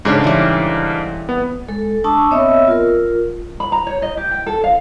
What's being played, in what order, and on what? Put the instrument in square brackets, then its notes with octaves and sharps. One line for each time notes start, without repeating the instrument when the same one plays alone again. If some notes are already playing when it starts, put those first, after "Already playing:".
[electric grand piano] G#2 C#3 D4 [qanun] C#4 A4
[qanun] E3 G3
[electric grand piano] B3
[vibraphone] G#3 A4
D4 A5 C#6 D#6 E6
B3 C4 C#5 D#5 E5 E6
F4 A#4
[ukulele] B5
A#5
C#5
D#5
G4
G5
A4
F5